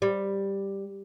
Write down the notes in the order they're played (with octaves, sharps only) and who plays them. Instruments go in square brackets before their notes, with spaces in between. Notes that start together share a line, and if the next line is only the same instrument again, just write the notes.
[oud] G3